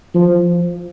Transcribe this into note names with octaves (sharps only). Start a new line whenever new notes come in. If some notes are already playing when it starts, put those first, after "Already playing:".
F3